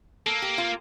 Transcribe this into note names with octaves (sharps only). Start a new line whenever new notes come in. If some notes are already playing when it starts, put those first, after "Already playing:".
A#3 A4
G4
F4